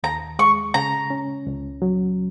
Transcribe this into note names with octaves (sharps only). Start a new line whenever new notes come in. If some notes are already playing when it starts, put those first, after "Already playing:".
D#2 A#5
G#3 C#6
C#3 A#5
C#4
C#2
F#3